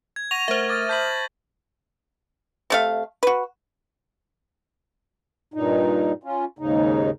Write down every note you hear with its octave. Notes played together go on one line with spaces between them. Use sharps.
G#6
F#5 C#6 A#6 D#7 F7
A3 A#4 C5 E5
D6 D#6 F6 A6
A5 B5 G6 B6 F#7
C3 A3 F5
F#4 B4
G2 A#2 D#4
C#4 F4
D#2 G#2 C#3 D#4